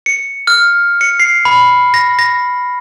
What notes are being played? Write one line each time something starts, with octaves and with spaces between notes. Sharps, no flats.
C#7
F6
C#7
C7
B5
A#6
A#6